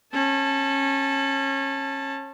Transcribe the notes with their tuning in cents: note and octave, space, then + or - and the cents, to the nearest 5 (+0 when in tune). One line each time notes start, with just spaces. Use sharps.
C#4 -25 A5 +0